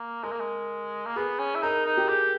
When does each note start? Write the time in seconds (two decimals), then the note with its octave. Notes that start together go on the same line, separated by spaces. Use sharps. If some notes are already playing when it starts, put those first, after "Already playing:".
Already playing: A#3
0.23 G#3 A#4
0.32 A#3
0.40 G#3
1.06 A#3
1.16 B3 G#4
1.39 C#4
1.55 E4
1.63 D#4 A#4
1.86 D#4
1.97 G4
2.09 G4 G#4